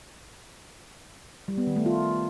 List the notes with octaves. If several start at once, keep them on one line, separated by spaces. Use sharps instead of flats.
G3
B3
D#3
A3
F4